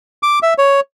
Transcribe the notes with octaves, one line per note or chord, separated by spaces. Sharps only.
D6
E5
C#5